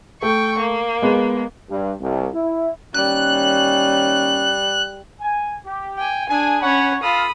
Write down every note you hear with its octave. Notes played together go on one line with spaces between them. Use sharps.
A3 G5 C#6
A#3
G#3 B3
G2
C2
E4
D#3 G3 A#3 C#4 F#6
G#5
G4
G5 G#5
D4 G#4 G#5
C#4 C#5 F#5 B5
F4 A4 F5 B5 D#6